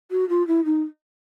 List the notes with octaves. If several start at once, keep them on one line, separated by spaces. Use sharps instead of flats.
F#4
F4
E4
D#4